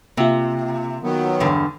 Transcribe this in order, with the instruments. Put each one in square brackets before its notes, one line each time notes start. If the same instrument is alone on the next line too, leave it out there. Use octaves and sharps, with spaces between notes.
[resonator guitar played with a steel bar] C3 [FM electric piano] A#3 F4
[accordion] D#3 F#3 B3
[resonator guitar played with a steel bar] E2 G2 D3